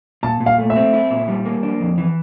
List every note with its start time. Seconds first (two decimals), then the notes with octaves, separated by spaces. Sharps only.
0.23 A#2 A5
0.40 A#2
0.46 F5
0.58 A3
0.70 E5
0.76 C4
0.93 E4
1.10 A#2
1.28 G3
1.45 A#3
1.63 D4
1.80 F2
1.98 E3